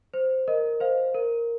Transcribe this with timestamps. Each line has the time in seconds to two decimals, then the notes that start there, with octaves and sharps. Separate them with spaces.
0.14 C5
0.48 A#4 D#5
0.80 C5 F5
1.14 A#4